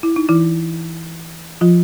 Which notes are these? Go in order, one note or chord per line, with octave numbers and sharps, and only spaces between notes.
E4
D#4
E3 E4
F3 F4